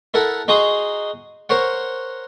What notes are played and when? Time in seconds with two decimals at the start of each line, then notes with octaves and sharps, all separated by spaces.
0.14 E4 A4 A#4 F#5
0.48 D#4 F#4 G#4 C6 D#6
1.49 A#4 C5 C#5 F#5